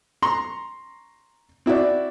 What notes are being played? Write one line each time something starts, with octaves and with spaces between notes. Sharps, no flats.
A#5 C6 C#6
C4 E4 F#4 D5